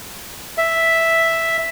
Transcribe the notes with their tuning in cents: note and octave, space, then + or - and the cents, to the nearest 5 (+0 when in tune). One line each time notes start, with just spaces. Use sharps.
E5 +0